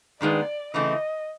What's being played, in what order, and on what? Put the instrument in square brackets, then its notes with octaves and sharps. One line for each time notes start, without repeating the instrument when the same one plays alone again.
[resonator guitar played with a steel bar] G2 D#3 G#3 B3 [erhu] D5
[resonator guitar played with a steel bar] C#3 E3 A3 C4 E4 [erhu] D#5